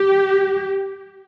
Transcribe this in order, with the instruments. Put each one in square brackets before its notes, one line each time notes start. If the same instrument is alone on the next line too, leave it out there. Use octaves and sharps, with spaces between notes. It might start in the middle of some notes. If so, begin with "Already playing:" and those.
Already playing: [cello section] G4